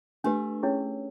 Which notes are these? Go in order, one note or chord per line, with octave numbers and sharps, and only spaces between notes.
A3 D4 G4 B4
C#4 E4 G#4 C#5